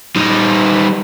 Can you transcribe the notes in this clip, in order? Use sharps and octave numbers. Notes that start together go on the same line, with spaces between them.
G3 D#4